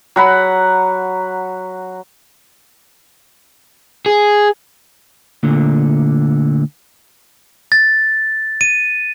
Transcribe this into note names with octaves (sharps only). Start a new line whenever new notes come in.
F#3 F#5 B5
G#4
D2 A#2 D3
A6
D#7